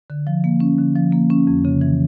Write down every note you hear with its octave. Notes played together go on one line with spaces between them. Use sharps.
D3
F3
A#3
C#4
D3
F3
A#3
C#4
F2
C#3
E3